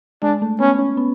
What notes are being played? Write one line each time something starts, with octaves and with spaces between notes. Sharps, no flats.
G#3 D4
A3
B3 C#4
C#4
B3